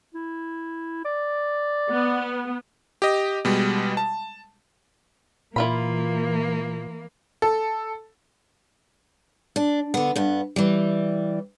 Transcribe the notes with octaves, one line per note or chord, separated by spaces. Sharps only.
E4
D5
B3
G4 D#5
B2 G3 G#3
A5
A#2 E3 A#3 E4 F4 B5
A4
D4
D3 B3
G2 B3
E3 G3